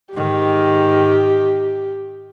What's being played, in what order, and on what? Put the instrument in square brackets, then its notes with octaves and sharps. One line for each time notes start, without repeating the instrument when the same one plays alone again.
[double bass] G#2 D#3 [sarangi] G4